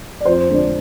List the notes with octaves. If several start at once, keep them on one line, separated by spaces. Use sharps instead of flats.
D5
F2 C5
D3 G#3 D4